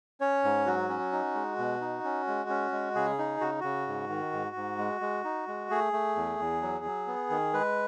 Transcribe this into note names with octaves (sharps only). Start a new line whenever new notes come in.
C#4 C#5
G#2
F#3 F#4
C#4
D#4
G#3
B2
D#4
C#4
G#3
C#4
G#3
C#3 G#4
D#4
C#3 F#4
C#3 F#4
G#2
D#3
G#2
G#2
G#3
G#3
D#4
G#3
A3 G#4
A3
E2
E2
F#3
F#3
B3
D#3
G#3 B4